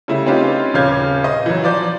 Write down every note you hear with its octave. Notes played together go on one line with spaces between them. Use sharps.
C#3 G3 A3 E4
C4 C#4 D#4 F4 G4 B4
D#1 C#3 C#4 F5 G6 G#6
D#5
E3 F#3
F3 D5 G6